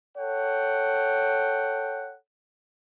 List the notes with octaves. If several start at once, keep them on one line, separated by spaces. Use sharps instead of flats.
A4 C#5 F#5 G5